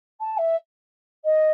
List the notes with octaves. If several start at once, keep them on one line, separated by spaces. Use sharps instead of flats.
A5
E5
D#5